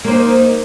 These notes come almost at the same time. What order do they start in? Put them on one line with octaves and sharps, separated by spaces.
A#3 C5 D#4